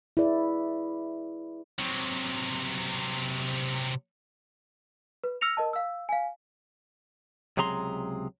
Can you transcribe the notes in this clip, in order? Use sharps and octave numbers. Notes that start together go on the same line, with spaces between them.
E4 G#4 B4 D5
C3 F#3
B4
E6 F6 A#6 C#7 F7
A#4 D#5 A5
F5 E6
F5 G#5
C#2 C3 F#3 G#4 A#5 C6